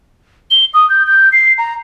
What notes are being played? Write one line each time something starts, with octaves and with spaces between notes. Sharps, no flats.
G7
D#6
G6
G6
C7
A#5